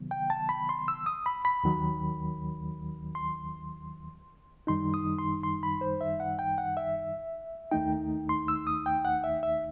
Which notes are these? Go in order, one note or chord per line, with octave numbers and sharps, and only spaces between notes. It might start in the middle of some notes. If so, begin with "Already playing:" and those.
Already playing: C3 D#3 F#3 B3
G5
A5
B5
C6
E6
D#6
B5
B5
D#2 D#3 F#3
C6
F#2 D#3 G3 D#4 C6
D#6
C6
C6
B5
C5
E5
F#5
G5
F#5
E5
D#2 D#3 A3 D#4 G5
C6
E6
D#6
G5
F#5
E5
E5